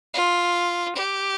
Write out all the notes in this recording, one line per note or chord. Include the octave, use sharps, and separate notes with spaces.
F4
G4